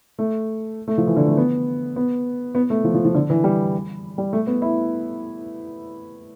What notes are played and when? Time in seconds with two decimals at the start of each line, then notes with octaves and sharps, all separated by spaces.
0.19 A3
0.88 A3
0.98 F3
1.07 E3
1.17 D3
1.28 A3
1.37 B3
1.96 B3
2.55 B3
2.70 A3
2.84 F3
2.94 F3
3.05 F3
3.15 D3
3.30 E3
3.44 G3
4.18 G3
4.33 A3
4.47 B3
4.62 E4